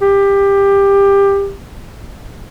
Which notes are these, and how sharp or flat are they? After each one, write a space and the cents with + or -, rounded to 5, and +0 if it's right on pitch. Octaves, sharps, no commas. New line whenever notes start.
G4 +20